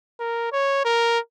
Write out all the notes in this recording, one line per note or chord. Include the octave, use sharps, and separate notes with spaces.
A#4
C#5
A#4